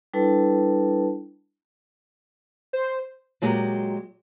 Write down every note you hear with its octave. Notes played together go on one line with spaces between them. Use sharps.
G3 D4 E4 A4 B4 A5
C5
A#2 F#3 G#3 G4